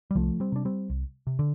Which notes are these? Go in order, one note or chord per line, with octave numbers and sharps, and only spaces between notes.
G3
C2 F3 A3
G3 C4
C3 D4
G3 C4
C2
C3
D3